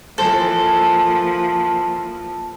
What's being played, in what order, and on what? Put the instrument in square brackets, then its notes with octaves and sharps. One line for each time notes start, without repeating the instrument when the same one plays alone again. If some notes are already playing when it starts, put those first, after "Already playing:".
[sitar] E3 C5 [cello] F3 A#3 [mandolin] A4